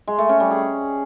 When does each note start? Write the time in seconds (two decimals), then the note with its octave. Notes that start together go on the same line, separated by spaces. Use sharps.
0.07 G#3
0.18 A3
0.29 C#4
0.40 G3
0.51 G#4